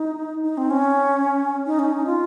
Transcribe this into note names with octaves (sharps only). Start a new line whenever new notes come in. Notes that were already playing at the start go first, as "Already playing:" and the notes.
Already playing: D#4
D#4
C4
C#4
D#4
C#4
D#4
F4